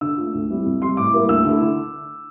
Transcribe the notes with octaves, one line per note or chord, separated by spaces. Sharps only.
D3 E6
A3 D4 F4
D2
C3 G3 C4 E4
F2
C3 G3 C6
A2 D6
G3 A#3 E4
D2 E6
D3 A3 E4
D3